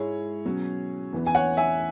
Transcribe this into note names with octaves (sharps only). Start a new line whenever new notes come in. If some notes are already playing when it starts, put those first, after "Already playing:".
Already playing: G#2 G#3 E4 G#4 C#5
B2 F#3 C#4
E2 E3 B3
G#5
C#5 F#5
E5 G#5